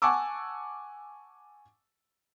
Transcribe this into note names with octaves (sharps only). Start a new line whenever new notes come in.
F#5 G#5 A5 C#6 D6 E6